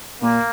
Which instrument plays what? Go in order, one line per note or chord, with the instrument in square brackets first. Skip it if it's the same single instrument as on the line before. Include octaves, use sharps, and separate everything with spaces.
[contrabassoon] A#2 [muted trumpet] A#3